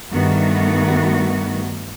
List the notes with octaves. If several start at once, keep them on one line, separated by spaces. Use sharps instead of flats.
G2 D#3 G3 A3 B3 F#4